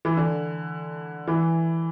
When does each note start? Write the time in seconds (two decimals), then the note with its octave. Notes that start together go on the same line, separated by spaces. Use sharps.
0.05 E3
0.17 D3
1.27 E3